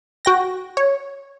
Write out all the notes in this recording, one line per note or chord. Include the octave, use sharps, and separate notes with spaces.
F#4 G5 A#6
C#5